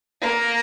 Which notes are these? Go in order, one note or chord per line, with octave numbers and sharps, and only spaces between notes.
A#3